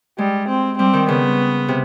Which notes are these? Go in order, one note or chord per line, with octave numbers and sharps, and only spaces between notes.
G3 G#3
C4
G3 C4
D#3
C#3 B3
C3